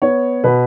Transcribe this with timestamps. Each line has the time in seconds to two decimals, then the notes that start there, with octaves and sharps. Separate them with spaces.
0.02 B3 C#5
0.44 B2 B4